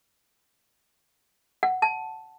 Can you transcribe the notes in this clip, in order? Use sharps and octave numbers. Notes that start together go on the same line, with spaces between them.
F#5
A5